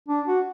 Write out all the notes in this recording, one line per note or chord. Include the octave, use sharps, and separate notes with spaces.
D4
F#4